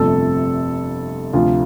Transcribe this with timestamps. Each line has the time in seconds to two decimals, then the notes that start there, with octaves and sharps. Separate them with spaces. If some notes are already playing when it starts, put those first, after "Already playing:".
Already playing: G1 F2 C3 A3 A4
1.33 D2 C3 F3 F4